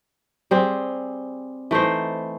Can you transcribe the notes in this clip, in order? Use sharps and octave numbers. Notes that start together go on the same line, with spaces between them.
G3 C4 G#4
E3 A3 D#4 C5